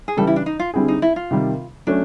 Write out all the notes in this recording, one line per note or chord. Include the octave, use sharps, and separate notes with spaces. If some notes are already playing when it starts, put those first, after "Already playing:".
G#4
C#3 E3 G3 A4
E4
D4
D#4
F4
D3 G3 C4 E4 G#4
D#4
E4
F4
C3 D#3 G3
F#3 A3 C#4 D4